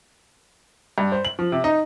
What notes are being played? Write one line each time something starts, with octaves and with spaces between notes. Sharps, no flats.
G2
C5
F#7
F3
C3
D#4